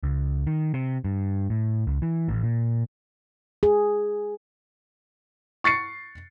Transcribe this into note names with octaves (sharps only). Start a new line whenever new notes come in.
C#2
D#3
C3
G2
A2
C#2
E3
A1
A#2
G#4
C#6 A6 C7 C#7